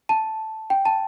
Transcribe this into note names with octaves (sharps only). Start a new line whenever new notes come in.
A5
G5
A5